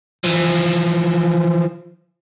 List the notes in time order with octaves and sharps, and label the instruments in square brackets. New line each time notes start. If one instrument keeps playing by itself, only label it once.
[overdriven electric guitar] E3 F3